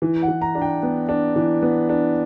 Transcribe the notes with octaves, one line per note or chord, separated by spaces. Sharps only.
E3
F#5
E3
A#5
D4
G5
B3
D4
E3
B3
D4